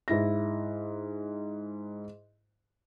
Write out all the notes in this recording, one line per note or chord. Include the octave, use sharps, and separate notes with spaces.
G#2 E4 A#6